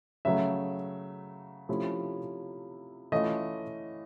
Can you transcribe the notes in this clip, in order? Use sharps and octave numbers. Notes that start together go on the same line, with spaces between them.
C#3 F#3 A3 E5
C3 F3 A3 C#4 E4
E3 A3 C#4 F4 D#5